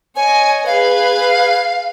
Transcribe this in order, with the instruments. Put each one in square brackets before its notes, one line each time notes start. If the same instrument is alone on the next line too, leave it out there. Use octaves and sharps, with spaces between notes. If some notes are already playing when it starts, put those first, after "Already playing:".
[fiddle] C#5 D#5 [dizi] G#5
[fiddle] G#4 B4 [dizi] F5